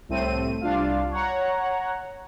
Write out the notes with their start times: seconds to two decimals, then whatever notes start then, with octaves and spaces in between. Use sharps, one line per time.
0.09 C2 A2 A3 C4 D#7
0.61 C2 D4 F4 F5
1.11 C#5 F#5 A#5